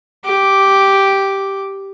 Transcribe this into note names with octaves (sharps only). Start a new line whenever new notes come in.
G4 D6